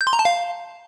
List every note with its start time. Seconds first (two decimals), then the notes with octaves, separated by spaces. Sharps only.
0.01 G6
0.07 C6
0.13 A#5
0.19 A5
0.25 F5